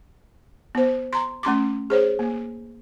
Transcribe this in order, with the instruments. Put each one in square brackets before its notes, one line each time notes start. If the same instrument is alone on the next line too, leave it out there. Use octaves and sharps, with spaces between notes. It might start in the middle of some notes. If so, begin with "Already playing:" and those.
[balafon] B3 C5
A#5 C6
A3 C#4 C6 D6
G#4 C5 C#5
A#3